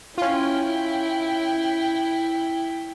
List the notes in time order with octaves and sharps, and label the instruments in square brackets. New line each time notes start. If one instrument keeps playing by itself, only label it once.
[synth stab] C#4 F4 [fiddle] E4 G5